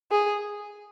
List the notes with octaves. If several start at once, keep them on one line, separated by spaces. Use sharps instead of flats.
G#4